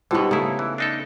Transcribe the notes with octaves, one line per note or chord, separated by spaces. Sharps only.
B2 D3 G3 B3 D#4 G4 C5
G#2 C#3 A3 E4 D#6
E3
D4 D#4 A4